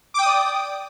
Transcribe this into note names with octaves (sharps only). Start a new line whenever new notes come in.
D5 G5 D6 D#6